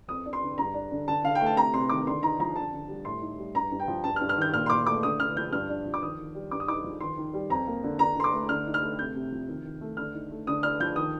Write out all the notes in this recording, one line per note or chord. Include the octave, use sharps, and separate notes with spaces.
F2 D#6
D4
C6
D3
G2 A#5
D4
D3
D3 A5
D3 F5
G5
A3
A5
C3 A#5
C3 C6
D#3 D6
D3 C6
D#4 A#5
F3 A#5
D3 A5
D3
G3
A2 C6
D#4
G3
G2 A#5
G2
G5
F3
G2 A5
F6
G2
F6
D#3 G6
A#2 F6
C6
A#2 D6
A3 D6
D3 D#6
D3 F6
F3 G6
G2 F6
D4
F3
D6
D#3 D#6
D#3
G3
G2 D6
D#6
D#4 D6
F3
D#3 C6
D#3
G3
F2 A#5
A#3
D3
D3 A#5
D3 C6
D6
A3
D3 F6
D#4
F6
A3
C3 G6
C3
F3
D#3
D#3
A3
D3 F6
D#4
A3
D3 D#6
D4 F6
F3 G6
D#3 D#6